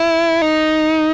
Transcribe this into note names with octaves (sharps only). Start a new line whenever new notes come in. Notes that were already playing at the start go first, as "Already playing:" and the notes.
Already playing: E4
D#4